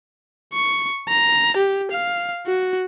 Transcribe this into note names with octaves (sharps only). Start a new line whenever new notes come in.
C#6
A#5
G4
F5
F#4